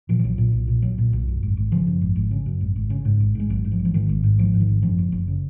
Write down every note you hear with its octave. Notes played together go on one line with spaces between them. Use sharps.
A#2 F3
F3
B1 F#3
A#2
B1
A#2
B1 F#3
A#2
B1
F#2
G#1
G#1
C#3 F3
F#2
G#1
G#1
C#3
F#2
G#1
G#1
C#3
G#2
G#1
G#2 G#3
G#1 F#3
G#2
F3
G#1
F3
G#2 D#3
G#1
G#2
G#1 F3
G#2
D#3
G#1
F#2 F3
F#1
F#1
C#3